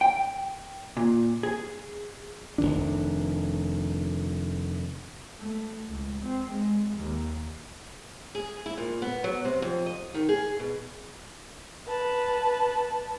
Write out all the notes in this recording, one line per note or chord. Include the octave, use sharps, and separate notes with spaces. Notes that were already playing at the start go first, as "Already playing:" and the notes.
G5
A#2
G#4
F1 D#2 D#3 D4
A3
C#2
C4
G#3
D#2
G#4
E4
A#2
B3
F#3
C3
F2
D#5
D#3
G#4
B2
B4 A5